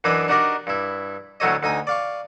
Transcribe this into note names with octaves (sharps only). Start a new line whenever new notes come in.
F#2 E3 D4 D#5 B5 D6
D4 D#4 F#4 G4 A#4 D5
G2 E4
D2 A2 F#3 A4 C#5 D#5
D2 D#4 G5 G#5 D#6
D5 F5 C#6